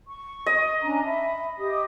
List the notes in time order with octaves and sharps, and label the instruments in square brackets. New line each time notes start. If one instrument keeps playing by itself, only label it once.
[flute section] C#6
[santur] D#5
[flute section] C#4 D4 A#5
E5 B5
G4 D#5 D#6